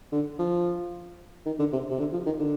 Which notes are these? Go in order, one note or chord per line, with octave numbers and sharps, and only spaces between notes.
D3
F3
D#3
D3
C3
C3
D3
F3
D#3
D3